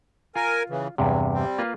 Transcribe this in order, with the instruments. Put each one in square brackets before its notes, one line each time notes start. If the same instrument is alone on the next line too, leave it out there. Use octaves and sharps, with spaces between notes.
[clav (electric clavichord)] F4 [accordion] A#4 G#5
[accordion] C#3 E3
[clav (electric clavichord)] E2 G2 C3 [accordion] F#3
[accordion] G3 C4
[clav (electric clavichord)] A#3 F4 B4